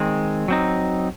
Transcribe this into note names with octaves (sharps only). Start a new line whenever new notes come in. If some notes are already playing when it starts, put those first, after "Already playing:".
Already playing: D#3 G#3 C4
F#3 C4 D#4